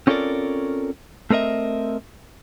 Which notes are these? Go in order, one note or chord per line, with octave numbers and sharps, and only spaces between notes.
C4 C#4 F4 A4 A#4 D5
A3 C4 A#4 D#5 E5